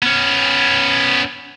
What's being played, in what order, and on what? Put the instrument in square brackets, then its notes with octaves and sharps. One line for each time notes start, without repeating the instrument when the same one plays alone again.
[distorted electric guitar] B3 C#4